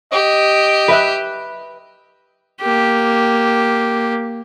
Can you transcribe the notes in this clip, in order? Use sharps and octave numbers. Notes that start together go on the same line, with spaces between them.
G4 D#5
B4 E5 F#6
A#3 G4